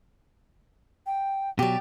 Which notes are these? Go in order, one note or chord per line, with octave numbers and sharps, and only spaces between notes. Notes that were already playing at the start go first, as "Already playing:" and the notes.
G5
B2 F#3 G4 D5